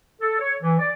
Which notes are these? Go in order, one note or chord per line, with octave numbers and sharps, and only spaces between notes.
A4
C#5
E3
D5